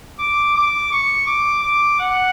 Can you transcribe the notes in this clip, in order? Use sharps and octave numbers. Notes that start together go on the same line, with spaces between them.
D6
D6
C#6
D6
D6
F#5